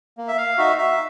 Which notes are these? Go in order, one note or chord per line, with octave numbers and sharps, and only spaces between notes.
A#3
E5
F5
D#4 F#4 E5
E5